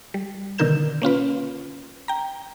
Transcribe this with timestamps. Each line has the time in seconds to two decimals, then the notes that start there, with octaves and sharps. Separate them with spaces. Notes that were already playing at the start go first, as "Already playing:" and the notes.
0.14 G3
0.58 B2 D3 D#3 A#4 G6 E7
1.02 A#3 C#4 F4 B4
2.08 G5 A#5